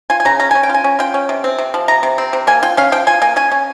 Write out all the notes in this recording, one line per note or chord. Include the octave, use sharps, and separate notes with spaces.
F4 G#5
G#5
C#3 A#5
C#4 A#5
C#4 G#5
G5
F4
G#5
C#4
F4 G5
C#4
C3
C4
C3
F3
C3 A#5
C3
C4
C3
A#3 G#5
F4 G5
C#4 F5
F3 G5
F4 G#5
A#3 G#5
C#4 G#5
C#4